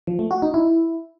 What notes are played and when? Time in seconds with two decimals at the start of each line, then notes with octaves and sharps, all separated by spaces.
0.07 F3
0.19 A3
0.31 F#4
0.42 D#4
0.54 E4